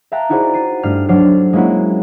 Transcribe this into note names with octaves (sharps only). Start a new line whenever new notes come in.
E5 F5 G5 A5 A#5 F#6
D#4 E4 F#4 G#4 C5 D5
A6 C7 D#7
G2 A3 F6 C7
F#3 D4 A4 C5 F6 C7
G#3 A#3 C#4 E4 F#4